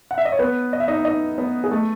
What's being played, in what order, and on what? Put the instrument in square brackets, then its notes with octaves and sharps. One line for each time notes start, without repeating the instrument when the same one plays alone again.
[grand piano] F#5
E5
D#5
C#5
B3 B4
D#5
E5
D#4 D#5
D#4 D#5
B3 B4
G#4
A3 A4